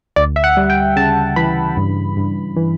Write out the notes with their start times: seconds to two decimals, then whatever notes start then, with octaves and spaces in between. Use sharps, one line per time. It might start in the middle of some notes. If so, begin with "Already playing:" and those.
0.16 D2 D5
0.36 E5
0.44 F#5
0.57 G3
0.70 G5
0.96 C#3 A5
1.36 E3 B5
1.77 G2
2.17 G2
2.56 E3